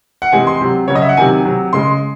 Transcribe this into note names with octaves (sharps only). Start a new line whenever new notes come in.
F#5
C3 E3 G#3 G#5
C6
C3 F#3
C#3 F#3 C#5
D#5
E5
F#5
C3 D#3 F#3 G#5
C3 F#3
C#3 G#3 C6